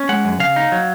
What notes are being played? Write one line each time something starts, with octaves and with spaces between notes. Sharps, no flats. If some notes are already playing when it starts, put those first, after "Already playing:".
Already playing: C#4
G#3 F#5
F#2
C#3 F5
D#4
F#3